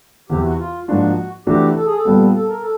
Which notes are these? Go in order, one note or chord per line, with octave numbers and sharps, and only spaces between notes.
E2 C3 E3 G4
F#4
F4
G#2 F3 A#3 D4 F4 F#4
C3 E3 A3 D4 F#4 G4
A4
G#4
A4
A#2 G3 B3
A4
A#4
A4